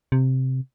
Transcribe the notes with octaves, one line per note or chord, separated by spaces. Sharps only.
C3